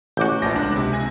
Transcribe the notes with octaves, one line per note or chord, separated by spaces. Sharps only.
A1 F#4 G#5 D6 G6
A#1 B4 A5 A#6
C#2 D4 F#6
C3
G#5 A#6